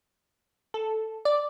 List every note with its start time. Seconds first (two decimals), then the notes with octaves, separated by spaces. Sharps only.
0.74 A4
1.25 D5